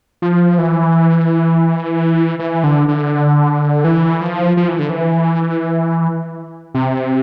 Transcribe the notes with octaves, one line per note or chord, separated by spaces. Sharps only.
F3
E3
E3
D3
D3
E3
F3
F3
E3
D3
E3
C3